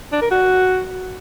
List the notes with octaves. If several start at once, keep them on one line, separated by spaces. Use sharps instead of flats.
D4
A#4
F#4